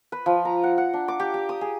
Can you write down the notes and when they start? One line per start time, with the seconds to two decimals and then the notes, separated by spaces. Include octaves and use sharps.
0.12 B4
0.26 F3
0.45 A#5
0.63 F#5
0.78 F#5
0.93 D4
1.08 D6
1.20 G4
1.34 G4
1.49 D#6
1.61 G#4